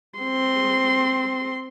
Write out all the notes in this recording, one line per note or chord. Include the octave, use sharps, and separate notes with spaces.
C4 C6